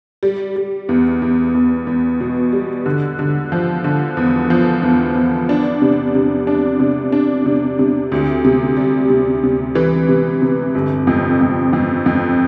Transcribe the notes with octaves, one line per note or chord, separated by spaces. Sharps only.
G3
G3
E2
E2
E2
E2
B2
G3
D3
D3
F3
D3
E2
F3
E2
E2
D4
C3
C3
D4
C3
D4
C3
C3
D2
C3
G3
C3
C3
E3
C3
C3
G1
F2
F2
F2
F2